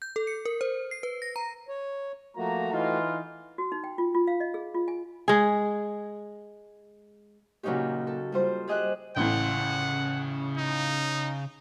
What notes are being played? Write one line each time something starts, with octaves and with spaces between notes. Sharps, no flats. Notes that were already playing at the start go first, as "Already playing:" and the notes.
G6
A4
C#7
A#4
C5
C7
B4
A#6
A#5
C#5
F3 A3 A#3 F#4 A#5
E3 D#4 F4
F#4
D#4
G5
F4
F4
F5
D#5
G#4
F4
G#5
G#3 G#4
A#2 C#3 F#3 C#4 D#4 G4
A4
G3 F4 C5
G4 G#4 D#5 E5 F#6
A1 A2 C#3 F#5 C6
D#4